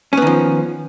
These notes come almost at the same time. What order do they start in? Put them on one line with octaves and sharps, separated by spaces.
C#4 B3 D#3 F3